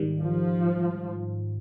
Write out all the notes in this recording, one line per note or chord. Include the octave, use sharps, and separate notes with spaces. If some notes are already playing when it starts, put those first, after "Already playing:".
Already playing: G#2 D#3 G3
F3